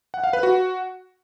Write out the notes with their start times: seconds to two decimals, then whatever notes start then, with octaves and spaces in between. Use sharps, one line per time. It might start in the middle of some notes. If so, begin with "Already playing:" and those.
0.14 F#5
0.24 F5
0.33 B4
0.43 F#4